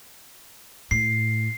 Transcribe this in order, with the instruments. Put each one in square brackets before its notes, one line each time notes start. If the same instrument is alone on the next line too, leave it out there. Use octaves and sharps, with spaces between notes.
[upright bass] A2 [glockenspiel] C7